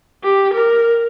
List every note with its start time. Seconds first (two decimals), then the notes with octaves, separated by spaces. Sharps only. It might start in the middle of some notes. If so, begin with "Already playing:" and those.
0.24 G4
0.54 A#4